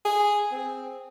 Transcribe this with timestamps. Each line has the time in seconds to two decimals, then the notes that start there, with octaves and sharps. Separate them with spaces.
0.05 G#4
0.52 C4